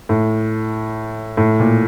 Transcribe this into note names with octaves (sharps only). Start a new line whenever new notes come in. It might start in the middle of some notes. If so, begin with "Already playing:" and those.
A2
A2
A#2